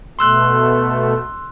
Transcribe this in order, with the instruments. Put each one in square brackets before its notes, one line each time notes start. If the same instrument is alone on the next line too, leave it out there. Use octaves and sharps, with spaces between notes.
[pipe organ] B2 A3 [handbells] C6 E6 F#6